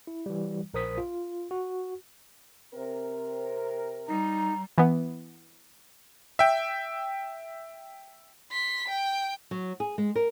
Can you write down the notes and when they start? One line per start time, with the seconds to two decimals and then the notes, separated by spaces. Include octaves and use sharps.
0.07 E4
0.26 E3 G3
0.74 A#1 A#4 C5 D#6 B6
0.98 F4
1.51 F#4
2.74 C3 C4 A#4
4.08 G3 D#4 A#5
4.78 E3 B3
6.39 E5 G5
8.52 C6 B6
8.87 G5
9.51 F#3
9.80 G#4
9.98 G#3
10.16 A#4